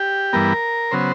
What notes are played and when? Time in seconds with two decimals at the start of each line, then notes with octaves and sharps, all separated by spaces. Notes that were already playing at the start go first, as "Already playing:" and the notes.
Already playing: G4
0.33 G2 E3 G3 B3 A#4
0.91 C#3 F#3 B3 C5